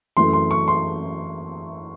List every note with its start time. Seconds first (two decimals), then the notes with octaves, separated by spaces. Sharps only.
0.17 F#2 E3 A3 C6
0.33 C6
0.51 C#6
0.68 C6